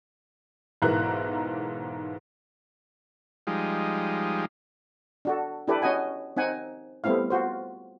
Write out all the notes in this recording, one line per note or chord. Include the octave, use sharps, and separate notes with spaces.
B1 G#2 E3 A#4 A#5 F#6
F3 G3 G#3 D#4
D4 F#4 A4
D4 E4 G4 A4 B4 D5
C#4 F#4 D#5 F#5 G#5
C4 D#4 F#5 G#5
G3 A3 B3 C4 E4 F5
F4 F#4 C5